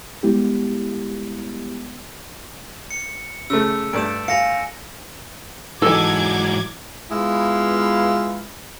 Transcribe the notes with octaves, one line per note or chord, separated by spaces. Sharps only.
G3 G#3 B3 E4 G4
C#7
C#3 A3 E6
G2 A3 D5 D7 E7
F5 G#5 A#6 C#7
G#2 E3 F#3 D#4 A4 G#5 D6 G#6
G#3 B3 E4 F4 B4 F5